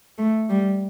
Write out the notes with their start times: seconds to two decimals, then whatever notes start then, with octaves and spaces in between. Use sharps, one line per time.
0.18 A3
0.50 G3